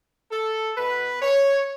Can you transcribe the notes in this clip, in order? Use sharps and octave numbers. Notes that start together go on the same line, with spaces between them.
A4
B2 B3 B4
C#5